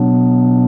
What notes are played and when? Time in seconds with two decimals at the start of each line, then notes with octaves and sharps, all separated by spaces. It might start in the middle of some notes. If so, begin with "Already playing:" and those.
Already playing: B2 F#3 B3 D4